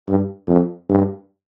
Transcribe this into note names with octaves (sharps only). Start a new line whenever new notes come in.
G2
F2
G2